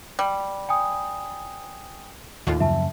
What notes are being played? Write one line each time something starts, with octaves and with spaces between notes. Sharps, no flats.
G3
G5 G#5 D#6
D#2 A2 F4
F#2 C#3 F3 E5 A5